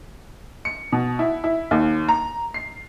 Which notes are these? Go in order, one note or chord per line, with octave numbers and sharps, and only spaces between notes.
C#7
B2
E4
E4
D#2
A#5
C7